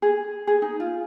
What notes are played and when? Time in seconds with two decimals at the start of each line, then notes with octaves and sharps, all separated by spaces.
0.02 G#4
0.47 G#4
0.62 D#4
0.80 F4